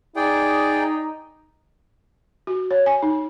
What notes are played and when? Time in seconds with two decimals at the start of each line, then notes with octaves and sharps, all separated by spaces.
0.16 D#4 G#4 D5 G5
2.47 F#4
2.71 C#5
2.86 G#5
3.03 D#4